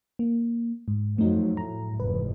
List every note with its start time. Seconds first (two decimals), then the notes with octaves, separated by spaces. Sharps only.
0.19 A#3
0.88 G#2
1.18 F2 F3 F#3 A3 D#4
1.57 A2 A#5
2.00 F1 E2 G#2 B4